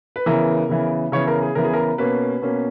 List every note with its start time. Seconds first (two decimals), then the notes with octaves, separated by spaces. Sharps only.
0.16 B4
0.26 C#3 E3 B3 A#4
0.69 C#3 E3 B3
1.12 C#3 E3 B3 C#5
1.27 A#4
1.42 G#4
1.55 C#3 E3 B3 A#4
1.64 G#4
1.73 A#4
1.98 B2 A#3 C#4 B4
2.42 B2 A#3 C#4